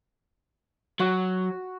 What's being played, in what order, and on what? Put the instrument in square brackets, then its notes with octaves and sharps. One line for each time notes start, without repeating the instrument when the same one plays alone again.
[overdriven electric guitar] F#3 [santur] F#4